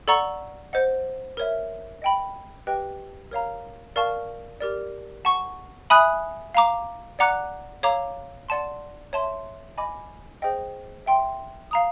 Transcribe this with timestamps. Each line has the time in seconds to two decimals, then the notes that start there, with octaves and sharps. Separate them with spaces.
0.08 A4 D5 F#5 A#5 C#6
0.73 C5 D#5 F#5
1.37 A#4 C#5 E5
2.02 D#5 G5 B5
2.67 G4 B4 D#5 G5
3.31 A#4 C#5 F5 A#5
3.96 A#4 D5 F5 A5 C#6
4.60 G4 A#4 D5
5.25 F#5 A5 C#6
5.90 E5 G#5 B5 D#6 F#6
6.55 F5 A#5 D6
7.19 D5 F#5 A#5 D6 F#6
7.83 A4 C#5 F5 A#5 D6
8.49 D5 F#5 A5 C6
9.13 C#5 E5 A5 C6
9.77 D#5 G#5 B5 D6
10.42 G#4 C5 D#5 G5
11.06 E5 G5 C6
11.71 F5 A#5 D#6